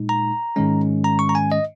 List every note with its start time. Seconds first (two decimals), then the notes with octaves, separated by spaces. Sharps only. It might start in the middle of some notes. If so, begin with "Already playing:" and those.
Already playing: A#2 G#3 D#4
0.09 A#5
0.56 G#2 D#3 G#3 C#4
1.04 A#5
1.19 C#6
1.29 A#5
1.35 G#5
1.52 D#5